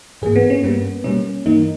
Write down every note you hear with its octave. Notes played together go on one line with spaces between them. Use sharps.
G#2 E3 A#3 G#4
B3
C#4
G2 G3 A#3 B3
B2 G3 A#3 C#4
G2 E3 A#3 D#4